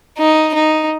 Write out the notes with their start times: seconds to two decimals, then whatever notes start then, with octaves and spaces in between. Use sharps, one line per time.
0.19 D#4
0.54 D#4